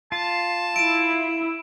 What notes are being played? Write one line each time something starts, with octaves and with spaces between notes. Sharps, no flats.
F4 A5
E4 D7 E7